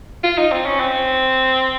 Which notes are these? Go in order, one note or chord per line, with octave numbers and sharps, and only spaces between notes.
F4
D#4
C4
C#4
C4